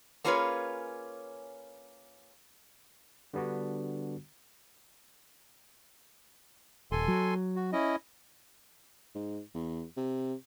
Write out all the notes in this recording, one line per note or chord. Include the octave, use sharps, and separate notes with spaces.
A#3 C#4 F4 G#4 B4 C#5
D3 G3 B3 D4 F#4
D#1 A4 G#5 C6
F#3
F#4
C#4 E4 D#5
G#2
E2
C3